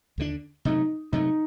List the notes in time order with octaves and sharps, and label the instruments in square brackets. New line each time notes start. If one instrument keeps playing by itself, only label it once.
[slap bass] D#2 D3 A3 D4
[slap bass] C3 F#3 A3 [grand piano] D#4
[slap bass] C3 F#3 A3 [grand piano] D#4